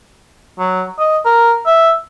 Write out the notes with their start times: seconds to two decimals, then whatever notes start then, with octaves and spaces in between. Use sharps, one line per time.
0.59 F#3
0.99 D#5
1.25 A#4
1.66 E5